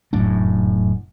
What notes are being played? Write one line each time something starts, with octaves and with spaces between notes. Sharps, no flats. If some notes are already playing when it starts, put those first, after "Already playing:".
F1 F#2 A2 D4